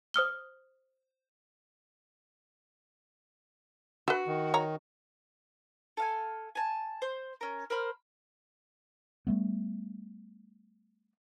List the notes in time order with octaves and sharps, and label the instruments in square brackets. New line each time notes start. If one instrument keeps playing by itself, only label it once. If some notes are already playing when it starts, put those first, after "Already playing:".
[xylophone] C5 D#6 F6 G7
[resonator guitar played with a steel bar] F#4 [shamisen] B4 E5
[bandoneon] D#3
[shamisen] C#5 A#5
[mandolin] A4 F5 G#5
G#5 A5
C5
C#4 A#4
A#4 C5 B5 F6
[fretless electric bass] G3 A3 B3